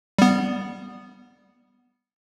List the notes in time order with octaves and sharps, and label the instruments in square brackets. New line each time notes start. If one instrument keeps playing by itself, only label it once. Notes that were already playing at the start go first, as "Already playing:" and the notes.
[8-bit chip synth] G3 B3